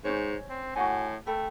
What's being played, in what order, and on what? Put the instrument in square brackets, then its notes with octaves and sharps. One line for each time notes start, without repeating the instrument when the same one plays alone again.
[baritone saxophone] G#2 [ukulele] C#4 C5 C#5
[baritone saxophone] C4
[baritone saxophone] A2 [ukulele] F#4 F#5 G#5
[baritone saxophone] A3 [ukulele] A4 G5 B5